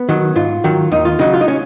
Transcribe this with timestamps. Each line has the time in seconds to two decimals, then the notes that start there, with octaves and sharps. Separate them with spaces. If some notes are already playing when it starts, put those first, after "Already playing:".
Already playing: B3
0.09 D#3 F#3
0.36 G#2 F4
0.64 D#3 F#3
0.92 D#2 D#4
1.05 F4
1.19 C#3 F#3 D#4
1.33 F4
1.41 D#4
1.48 C#4